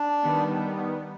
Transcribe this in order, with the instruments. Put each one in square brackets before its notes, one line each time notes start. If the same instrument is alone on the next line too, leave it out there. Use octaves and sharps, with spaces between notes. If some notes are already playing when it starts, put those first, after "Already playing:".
Already playing: [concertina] D4
[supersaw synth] D#3 G3 B3